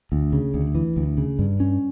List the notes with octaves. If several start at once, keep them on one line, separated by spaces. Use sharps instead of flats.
D2
C#3
D2
E3
D2
C#3
G2
C#4